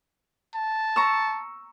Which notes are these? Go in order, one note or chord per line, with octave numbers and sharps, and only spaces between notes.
A5
A#5 C#6 E6